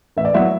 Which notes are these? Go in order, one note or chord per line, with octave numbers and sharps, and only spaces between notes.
A1 E5
D5
F#3 B3 E4 E5